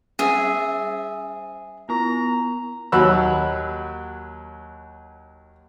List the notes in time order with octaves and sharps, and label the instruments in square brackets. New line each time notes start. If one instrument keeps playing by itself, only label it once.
[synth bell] G3 C5 [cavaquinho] G#4 E5
[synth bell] B3 E4 [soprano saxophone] A#5
[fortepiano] D#2 F#3 F#5 B5 E6